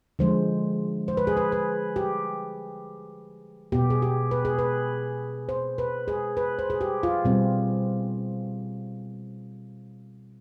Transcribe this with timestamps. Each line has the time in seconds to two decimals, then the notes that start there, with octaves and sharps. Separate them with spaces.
0.19 D3 F3 G#3 C5
1.08 C5
1.17 B4
1.27 G#4
1.37 B4
1.52 B4
1.96 G4
3.72 B2 B3 G4
3.90 G#4
4.02 G4
4.31 B4
4.45 G#4
4.59 B4
5.49 C5
5.78 B4
6.08 G#4
6.37 B4
6.59 C5
6.70 G#4
6.81 G4
7.03 F4
7.25 B2 G3 C4